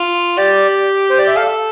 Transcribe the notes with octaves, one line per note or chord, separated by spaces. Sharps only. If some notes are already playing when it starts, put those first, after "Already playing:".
Already playing: F4
G4 D5
C5
D5
E5
A4 F5